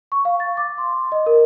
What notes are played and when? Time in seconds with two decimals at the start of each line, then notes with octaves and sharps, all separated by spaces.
0.12 C#6
0.25 F5
0.40 A6
0.57 D6
0.78 C6
1.12 D#5
1.26 A#4